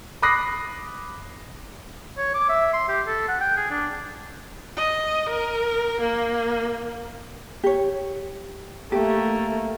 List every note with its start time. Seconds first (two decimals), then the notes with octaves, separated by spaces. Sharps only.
0.22 B5 D6 D#6 F#6 A#6 C7
2.17 C#5
2.34 D6
2.49 E5
2.73 C6
2.88 G4
3.07 A4
3.28 F#5
3.41 G5
3.57 G#4
3.71 D4
4.77 D#5
5.29 A#4
6.00 A#3
7.64 G4 C#5
8.92 A3 A#3 G4